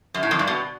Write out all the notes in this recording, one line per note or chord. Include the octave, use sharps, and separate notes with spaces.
F#2
A2
F2
G2
B2